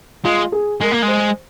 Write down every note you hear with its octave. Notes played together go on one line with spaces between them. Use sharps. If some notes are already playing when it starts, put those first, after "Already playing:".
G#3 F4
G#4
G#3 A#4
A#3
G#3
C5